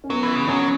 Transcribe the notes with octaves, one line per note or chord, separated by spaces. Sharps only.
C#4
F#3 B3
E3
C#3
F#3 C#4